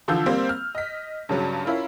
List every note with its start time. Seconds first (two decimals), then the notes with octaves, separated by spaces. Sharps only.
0.08 D3 E3 F3 F4 E6 G6
0.26 G3 A#3 C4 C5 F5
0.49 F6
0.75 D#5 B6
1.29 G2 C#3 F#3
1.65 C#4 E4 F4 A#4